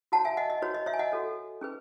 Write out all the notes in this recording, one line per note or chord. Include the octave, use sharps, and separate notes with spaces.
F#4 C#5 F#5 A5
E5 G#5
D#5 F#5
D#5
F#4 B4 C#5
D#5
C#5 E5
G#5
D#5 F#5
F#4 A4 C#5
C#4 G#4 B4